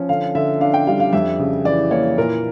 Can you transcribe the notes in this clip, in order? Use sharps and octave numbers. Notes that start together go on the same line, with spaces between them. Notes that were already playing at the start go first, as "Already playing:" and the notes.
Already playing: F3 C#4
D3 F5
D3 E5
D4 F5
G5
G3 F5
F5
F2 E5
C#3
E3 D5
A#3 C#5
A#2 A#4